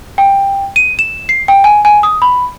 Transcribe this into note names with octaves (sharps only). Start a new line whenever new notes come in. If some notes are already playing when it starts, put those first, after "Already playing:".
G5
D#7
E7
C7
G5
G#5
G#5
D#6
B5